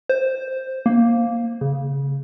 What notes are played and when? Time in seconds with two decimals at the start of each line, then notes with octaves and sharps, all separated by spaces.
0.09 C5
0.86 A#3
1.61 C#3